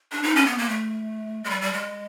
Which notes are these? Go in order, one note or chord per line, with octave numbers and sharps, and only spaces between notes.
D4
D#4
C#4
B3
A#3
A3
G#3
G3
G3
G#3